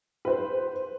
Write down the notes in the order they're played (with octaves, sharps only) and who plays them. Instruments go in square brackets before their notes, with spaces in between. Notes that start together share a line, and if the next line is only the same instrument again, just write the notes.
[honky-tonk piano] B4 C5